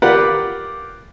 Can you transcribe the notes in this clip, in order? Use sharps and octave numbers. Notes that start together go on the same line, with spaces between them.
F4 G4 A#4 B4 D5 F#5